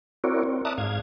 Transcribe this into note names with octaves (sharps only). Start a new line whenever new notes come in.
C4 E4 F#4 A#4 C#5 D5
C4
D5 E5 A5 A#5 D#6 F#6
G#2 F5 G#6